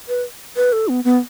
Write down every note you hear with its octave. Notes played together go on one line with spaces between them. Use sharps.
B4
B4
A4
B3
B3